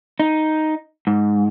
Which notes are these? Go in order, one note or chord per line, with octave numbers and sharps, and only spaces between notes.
D#4
G#2